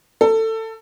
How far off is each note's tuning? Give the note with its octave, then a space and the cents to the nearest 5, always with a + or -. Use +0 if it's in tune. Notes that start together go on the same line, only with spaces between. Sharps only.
A4 +20